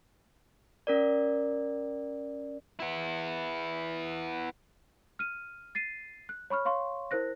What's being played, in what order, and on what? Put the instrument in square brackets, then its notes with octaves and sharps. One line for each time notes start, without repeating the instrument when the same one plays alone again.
[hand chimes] C#4 A#4 D5
[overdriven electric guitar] B3 E4
[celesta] F6 D#7
A6 C7 D#7
F#6
C#5 B5 C#6 F6
C#5 F5 C6 C#6
E4 A#4 C5 F#6 A#6